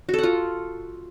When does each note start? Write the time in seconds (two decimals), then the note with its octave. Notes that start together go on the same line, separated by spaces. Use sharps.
0.09 F#4
0.14 A4
0.18 F#5
0.23 F4